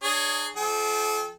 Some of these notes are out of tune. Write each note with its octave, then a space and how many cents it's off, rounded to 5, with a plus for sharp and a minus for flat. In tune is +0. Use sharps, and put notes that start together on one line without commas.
D4 +35 G#4 +0 C#5 +15
F3 -10 A4 -40 G5 +0